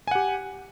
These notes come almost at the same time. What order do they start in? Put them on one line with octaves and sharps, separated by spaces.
G#5 F#5 G4